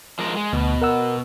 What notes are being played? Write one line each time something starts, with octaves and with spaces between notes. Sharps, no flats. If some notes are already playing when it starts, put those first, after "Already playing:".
F3 G#3 A#4
G#3
D2 B2
A#4 F#5 E6